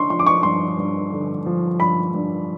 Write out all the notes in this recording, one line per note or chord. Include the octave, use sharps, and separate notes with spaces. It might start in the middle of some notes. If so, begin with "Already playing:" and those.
Already playing: D3 C6 C#6
F3 C6
D6
C#6
G2 C6
G2
D3
F3
G2 B5
G2